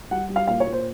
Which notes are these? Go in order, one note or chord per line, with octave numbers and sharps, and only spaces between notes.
G3 F#5
G3
F5
A#2 F5
C#5
A#2
C5